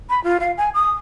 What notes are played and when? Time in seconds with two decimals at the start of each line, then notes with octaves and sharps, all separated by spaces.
0.10 B5
0.24 F4
0.40 F5
0.57 G#5
0.74 D#6